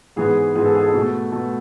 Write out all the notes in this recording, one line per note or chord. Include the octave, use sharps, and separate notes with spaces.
G#2 E3 G#3 B3 G#4
G#2 E3 G#3 B3 G#4
A4
G#4
A4
B2 A3
B2 A3